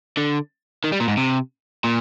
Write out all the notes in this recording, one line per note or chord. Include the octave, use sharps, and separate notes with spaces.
D3
D#3
G3
A#2
G#2
C3
A#2